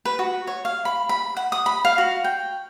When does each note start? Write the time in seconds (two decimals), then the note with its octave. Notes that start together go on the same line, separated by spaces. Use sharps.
0.05 B4
0.19 F#4
0.47 C#5
0.65 F5
0.85 B5
1.09 B5
1.37 F#5
1.52 D#6
1.66 B5
1.85 F5
1.98 F#4
2.24 G5